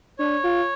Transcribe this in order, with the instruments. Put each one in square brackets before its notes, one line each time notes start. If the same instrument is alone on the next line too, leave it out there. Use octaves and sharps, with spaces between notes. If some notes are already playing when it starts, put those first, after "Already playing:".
[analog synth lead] D4 [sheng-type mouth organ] C#5
[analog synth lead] F4